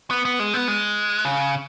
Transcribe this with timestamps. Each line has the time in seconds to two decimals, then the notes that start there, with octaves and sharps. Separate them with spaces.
0.11 B3
0.25 B3
0.39 G#3
0.54 B3
0.68 G#3
1.25 C#3